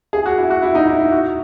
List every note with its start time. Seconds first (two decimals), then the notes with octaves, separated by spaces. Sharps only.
0.13 G#4
0.26 F#4
0.38 E4
0.50 F#4
0.62 E4
0.75 D#4
0.87 E4
1.00 E4
1.12 F#4